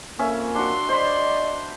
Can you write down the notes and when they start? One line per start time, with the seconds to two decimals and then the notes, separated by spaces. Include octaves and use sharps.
0.19 F2 A#3 C#4 E5
0.55 D4 F#4 C6
0.89 C5 D5 D#5 B5